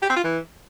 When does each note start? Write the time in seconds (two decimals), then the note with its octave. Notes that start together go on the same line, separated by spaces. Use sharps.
0.02 G4
0.09 C4
0.17 F4
0.24 E3